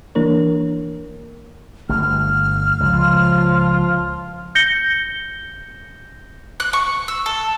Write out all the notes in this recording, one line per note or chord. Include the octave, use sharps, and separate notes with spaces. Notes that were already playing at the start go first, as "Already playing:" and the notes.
E3 A#3 D4 A#4 C#5
G1 A3 F6
C#2 F3 F4
G6 A#6 C#7 G7
F#6
C#6
E6
A4